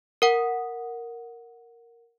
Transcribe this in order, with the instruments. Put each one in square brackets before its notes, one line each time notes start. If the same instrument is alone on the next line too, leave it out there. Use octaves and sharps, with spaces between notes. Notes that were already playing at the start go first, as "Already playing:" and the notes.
[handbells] A#4 F#5